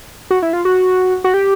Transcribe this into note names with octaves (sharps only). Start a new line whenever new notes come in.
F#4
E4
F4
F#4
F#4
G4